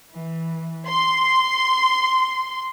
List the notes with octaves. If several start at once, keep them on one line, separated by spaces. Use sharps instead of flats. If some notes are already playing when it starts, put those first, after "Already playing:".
E3
C6